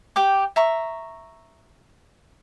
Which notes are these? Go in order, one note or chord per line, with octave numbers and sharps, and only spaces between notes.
G4 G5 D6
E5 A#5 C#6